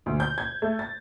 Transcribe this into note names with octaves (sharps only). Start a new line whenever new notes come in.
D2
G6
G#6
A3
A6